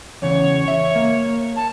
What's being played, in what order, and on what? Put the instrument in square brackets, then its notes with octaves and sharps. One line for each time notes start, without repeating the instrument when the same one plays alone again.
[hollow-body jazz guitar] E2 C#3 [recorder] C#5
[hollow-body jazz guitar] E5
A#3
[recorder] A5